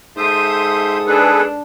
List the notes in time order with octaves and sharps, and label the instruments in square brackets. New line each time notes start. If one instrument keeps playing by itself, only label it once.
[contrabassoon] G#2 [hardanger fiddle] A4 D#6 [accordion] E5 C6 G6
[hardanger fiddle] D4 [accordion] G#4 A4 B4